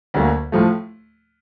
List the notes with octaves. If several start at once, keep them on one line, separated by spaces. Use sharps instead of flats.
D2 D3 F#3 A#3
A2 F3 A3